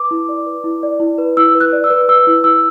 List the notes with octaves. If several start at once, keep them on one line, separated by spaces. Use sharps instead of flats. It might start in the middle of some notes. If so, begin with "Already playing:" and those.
Already playing: B4 D6
E4
D5
B4
E4
D5
E4
B4
E4 E6
B4
F#6
D5
E6
B4
B4 E6
E4
E4 E6